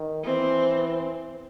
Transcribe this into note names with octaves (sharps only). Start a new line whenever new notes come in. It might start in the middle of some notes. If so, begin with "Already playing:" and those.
Already playing: D#3
E3 C4